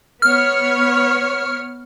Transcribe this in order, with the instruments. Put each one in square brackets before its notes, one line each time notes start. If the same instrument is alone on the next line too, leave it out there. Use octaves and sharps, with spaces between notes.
[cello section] B3 C#5 [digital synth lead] F6